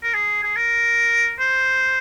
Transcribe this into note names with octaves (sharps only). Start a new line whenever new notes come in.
A#4
G#4
G#4
A#4
C5